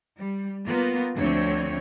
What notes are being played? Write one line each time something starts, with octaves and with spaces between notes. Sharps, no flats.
G3
A#3 B3 F4
D2 D3 F3 C4 C#5